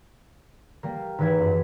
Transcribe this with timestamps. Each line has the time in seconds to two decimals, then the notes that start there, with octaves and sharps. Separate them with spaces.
0.83 G3 A#3
1.18 G#1 E3 B4 G#6
1.40 F#2